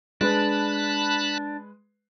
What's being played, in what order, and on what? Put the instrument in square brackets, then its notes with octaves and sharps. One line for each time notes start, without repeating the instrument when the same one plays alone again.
[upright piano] G#3 B4 [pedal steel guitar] D4 [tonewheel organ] A5 B5 F#6